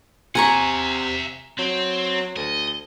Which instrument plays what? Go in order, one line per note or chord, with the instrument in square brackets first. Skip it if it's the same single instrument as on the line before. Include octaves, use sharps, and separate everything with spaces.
[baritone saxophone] C3 [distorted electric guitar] E5 F#5 [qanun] G#5 A#5 C#6
[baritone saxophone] F#3 [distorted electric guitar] C4
[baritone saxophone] D2 [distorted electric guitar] D#5